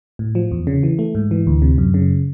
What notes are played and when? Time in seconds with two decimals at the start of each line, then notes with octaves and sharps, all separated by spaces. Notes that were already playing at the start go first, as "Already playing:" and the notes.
0.19 A2
0.35 F3
0.51 E2
0.67 C#3
0.83 E3
0.99 A3
1.15 G#2
1.31 E3
1.47 D2
1.62 C3
1.78 F#2
1.94 C#3